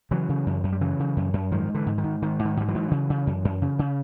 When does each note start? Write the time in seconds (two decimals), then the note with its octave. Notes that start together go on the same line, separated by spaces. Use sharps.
0.11 C#3 E3 F#3
0.29 C#3
0.46 F#2
0.64 F#2
0.72 G3
0.81 C#3 E3 F#3
0.99 C#3
1.16 F#2
1.33 F#2
1.51 G#2 D#3 F3
1.68 G#2
1.74 D3 E3
1.86 G#2
1.98 D#3
2.04 G#2
2.22 G#2 D#3
2.39 G#2
2.45 D#3
2.57 G#2 G3
2.68 E3 F#3
2.75 G#2
2.91 C#3
3.10 C#3
3.27 F#2
3.45 F#2
3.62 C#3
3.79 C#3